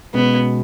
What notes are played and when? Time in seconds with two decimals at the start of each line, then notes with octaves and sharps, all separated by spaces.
0.14 B2 G#3 B3 C#4 F#4